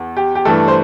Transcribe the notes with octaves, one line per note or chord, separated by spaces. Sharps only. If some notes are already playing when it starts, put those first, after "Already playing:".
Already playing: E2
G4
G4
G2 E3 A3 A4
C5